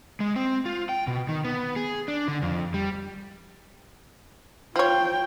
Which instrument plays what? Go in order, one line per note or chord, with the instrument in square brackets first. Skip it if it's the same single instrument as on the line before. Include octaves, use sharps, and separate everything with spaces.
[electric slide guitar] G#3
C4
F4
G5
B2
D#3
B3
G#4
D4
D3
F2
G3
[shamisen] F3 C#5 [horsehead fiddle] F4 G5